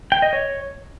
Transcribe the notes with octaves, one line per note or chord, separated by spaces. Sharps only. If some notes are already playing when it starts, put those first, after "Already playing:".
G5
D#5
C#5